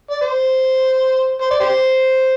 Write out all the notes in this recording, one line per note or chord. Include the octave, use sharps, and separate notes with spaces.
D5
C5
C5
D5
G4 C5